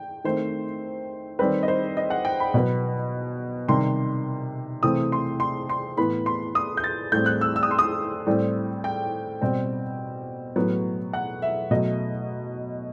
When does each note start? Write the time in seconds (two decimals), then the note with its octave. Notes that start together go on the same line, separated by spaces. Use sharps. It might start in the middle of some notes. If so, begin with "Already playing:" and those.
Already playing: G5
0.24 D#3 A3 C4 C5
1.39 D#3 G3 C4 B4
1.63 D#5
1.68 C5
1.97 D#5
2.10 F#5
2.25 G5
2.40 B5
2.54 B2 F#3 B3
3.68 C3 D#3 G3 C6
4.83 C3 E3 A3 C4 D#6
5.12 C6
5.40 C6
5.69 C6
5.97 A2 E3 B3 B5
6.26 C6
6.55 D#6
6.77 G6
6.84 A6
7.12 A2 G3 C4 G6
7.26 F#6
7.41 E6
7.56 E6
7.63 D#6
7.71 C6
7.79 D#6
8.27 A2 G3 C4
8.84 G5
9.42 B2 G3 C4
10.56 A2 F#3 B3
11.13 F#5
11.42 E5
11.71 B2 F#3 A3 D#5